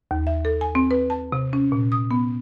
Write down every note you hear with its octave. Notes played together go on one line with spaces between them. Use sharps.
D#2
E5
A4
G#5
C4
B4
A5
C3
C#4
A#2
D#6
B3